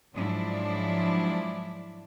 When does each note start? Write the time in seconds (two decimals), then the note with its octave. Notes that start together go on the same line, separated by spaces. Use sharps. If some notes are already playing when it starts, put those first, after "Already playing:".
0.14 G#2 F3 F#3 D4 E4 D5